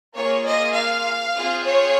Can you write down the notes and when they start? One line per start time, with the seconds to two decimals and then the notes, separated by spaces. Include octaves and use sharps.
0.16 A#3 F4 G#4 C#5
0.46 D#5
0.75 F5
1.36 C4 F4 G#4
1.65 C#5